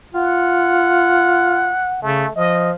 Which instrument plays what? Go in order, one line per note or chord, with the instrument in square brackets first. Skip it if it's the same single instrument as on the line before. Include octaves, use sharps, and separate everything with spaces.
[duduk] F4 [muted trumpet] F#5
[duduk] C#3 [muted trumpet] A3
[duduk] F3 [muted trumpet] D#5